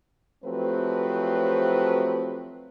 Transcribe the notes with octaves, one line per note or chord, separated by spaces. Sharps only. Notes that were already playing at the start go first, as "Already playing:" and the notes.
F3 F#3 A3 C4 G4 B4